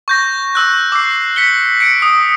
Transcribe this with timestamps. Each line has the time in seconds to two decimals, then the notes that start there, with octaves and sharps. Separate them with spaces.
0.08 C#6 G6 A#6
0.55 C#6 E6 F#6
0.92 D6 E6 C7
1.36 B6 C#7 G7
1.80 C#7 D7
2.02 D#6